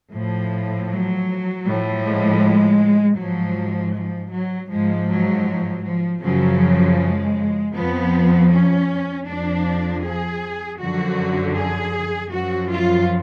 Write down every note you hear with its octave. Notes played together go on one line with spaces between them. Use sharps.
A2 F3
F#3
A2 F3
G#3
G#2 F3 F#3
F3
F#3
G#2 F3 G#3
F#3
F3
F#2 C#3 F3 F#3
G#3
F2 F3 B3
C#4
F2 F3 D4
G#4
F#2 D3 F3 F#4
G#4
F#2 F3 F#4
F4